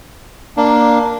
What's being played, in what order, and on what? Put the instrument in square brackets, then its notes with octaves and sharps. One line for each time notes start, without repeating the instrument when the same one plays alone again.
[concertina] A#3 D4